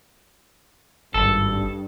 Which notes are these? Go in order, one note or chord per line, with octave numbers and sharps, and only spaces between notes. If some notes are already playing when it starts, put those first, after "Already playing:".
G#1 G2 A4